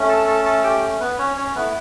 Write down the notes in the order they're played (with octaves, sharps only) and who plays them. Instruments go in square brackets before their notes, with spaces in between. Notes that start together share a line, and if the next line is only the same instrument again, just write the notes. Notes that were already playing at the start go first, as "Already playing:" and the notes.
Already playing: [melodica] A3 C#4
A4 A5
A4 A5
A4 A5
G4 G5
B3 B4
C#4 C#5
C#4 C#5
A3 B3 E4 B4